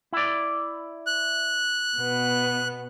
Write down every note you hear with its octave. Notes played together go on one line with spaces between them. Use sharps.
E4 D5
F#6
B2 B3